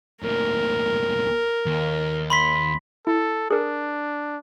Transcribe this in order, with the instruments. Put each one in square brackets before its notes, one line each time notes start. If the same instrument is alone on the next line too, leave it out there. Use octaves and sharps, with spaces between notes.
[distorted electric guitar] D2 A#2 [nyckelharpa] A#4
[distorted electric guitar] D#2
[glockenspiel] B5 C6 B6
[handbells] E4 [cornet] A4
[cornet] D4 [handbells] G#4 A#4